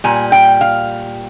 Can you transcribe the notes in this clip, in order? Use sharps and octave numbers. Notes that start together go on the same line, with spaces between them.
A#2 G3 G#5
G5
F5